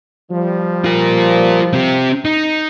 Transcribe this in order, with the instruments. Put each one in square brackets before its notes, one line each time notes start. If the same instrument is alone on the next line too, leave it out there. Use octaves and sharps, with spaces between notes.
[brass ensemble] F3 G3
[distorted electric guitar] F4 A#4
C4 G4
D#4